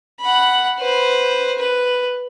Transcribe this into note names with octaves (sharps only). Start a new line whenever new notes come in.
F#5 B5
B4 C5
B4